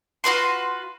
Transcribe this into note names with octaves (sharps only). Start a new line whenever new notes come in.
F4 F#4 B4 C6